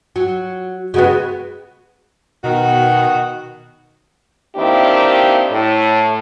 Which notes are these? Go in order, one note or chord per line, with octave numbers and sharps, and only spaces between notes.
F#3
C#3 G#3 B3 F#4
B2 D#3 F#4
D#3 A#3 C4 D4 E4 G4
A2